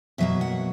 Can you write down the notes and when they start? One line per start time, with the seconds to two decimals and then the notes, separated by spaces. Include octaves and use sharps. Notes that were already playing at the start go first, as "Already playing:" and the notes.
0.18 B2 F#3 A#3 E5
0.41 F#5